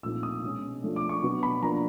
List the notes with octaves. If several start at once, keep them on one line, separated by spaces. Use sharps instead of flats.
A#2 F3 A3 C4 D#4 E6
D#6
B2 G#3 C#4
F3 A3 D4
D6
C#6
B2 F#3 B3 D4
B5
F3 A#3 D4 A#5